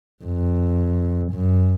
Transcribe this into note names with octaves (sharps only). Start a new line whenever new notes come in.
F2
F#2